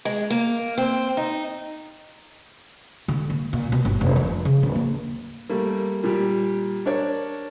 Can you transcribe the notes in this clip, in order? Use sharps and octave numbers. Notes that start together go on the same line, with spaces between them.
G#3
A#3
C4
D#4
D3
A#3
A#2
B2
G1
F1
F3
C#3
D1
A#3
G3 A3 A#3
A#2 G3 G4
D4 A#4 C#5 D5